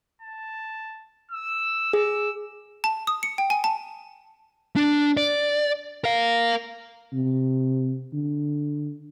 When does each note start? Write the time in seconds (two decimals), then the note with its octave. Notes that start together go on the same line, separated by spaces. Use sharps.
0.22 A5
1.31 E6
1.93 G#4 E6
2.84 A5
3.07 D#6
3.23 C#7
3.38 G5
3.50 G#5
3.64 A5
4.76 D4
5.17 D5
6.04 A#4 F5
7.12 C3
8.13 D3